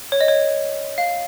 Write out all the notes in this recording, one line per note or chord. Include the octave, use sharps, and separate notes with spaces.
C#5
D#5
C#5
F5